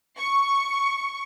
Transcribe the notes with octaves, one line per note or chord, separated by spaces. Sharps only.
C#6